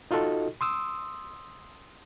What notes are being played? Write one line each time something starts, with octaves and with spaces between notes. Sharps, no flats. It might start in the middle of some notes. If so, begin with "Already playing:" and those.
D#4 F4 F#4 A4 D#5
C6 D#6 E6